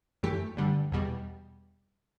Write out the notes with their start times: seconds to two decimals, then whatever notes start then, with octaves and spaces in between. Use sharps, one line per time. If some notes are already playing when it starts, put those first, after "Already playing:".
0.23 F#2 E3 A3 G4
0.57 G2 D3 G3
0.92 E2 B2 G3